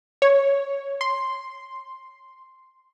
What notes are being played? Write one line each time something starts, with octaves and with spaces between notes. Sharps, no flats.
C#5
C6